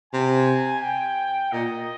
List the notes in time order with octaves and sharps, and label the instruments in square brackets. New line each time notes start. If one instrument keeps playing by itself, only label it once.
[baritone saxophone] C3 [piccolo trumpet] G#5
[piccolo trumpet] G5
[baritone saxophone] A#2 [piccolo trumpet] D#5